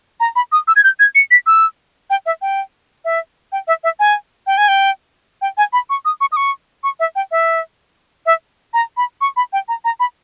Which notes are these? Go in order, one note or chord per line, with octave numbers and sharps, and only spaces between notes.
A#5
B5
D#6
E6
G#6
G6
G#6
C#7
B6
E6
G5
E5
G5
E5
G5
E5
E5
G#5
G5
G#5
G5
G5
G#5
B5
C#6
D#6
C#6
D#6
C#6
C#6
E5
G5
E5
E5
A#5
B5
C#6
B5
G5
A#5
A#5
B5